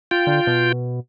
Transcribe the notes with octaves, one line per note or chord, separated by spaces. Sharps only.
F4 G5
D3
B2